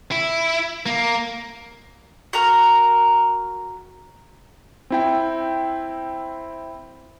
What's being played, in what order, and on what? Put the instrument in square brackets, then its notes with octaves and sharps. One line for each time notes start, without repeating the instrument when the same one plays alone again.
[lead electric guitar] E4
A#3
[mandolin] F#4 A#4 A#5 F6
[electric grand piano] C4 E4 G5